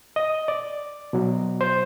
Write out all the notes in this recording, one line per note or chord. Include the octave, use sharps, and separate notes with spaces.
D#5
D5
B2 F#3
C5